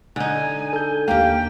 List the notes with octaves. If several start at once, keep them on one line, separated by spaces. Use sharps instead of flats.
D3 D#4 G#5
A4 G6
D#2 A#3 G4 F5 G5